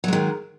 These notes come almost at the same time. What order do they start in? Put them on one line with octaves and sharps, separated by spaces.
F#3 G#3 D#3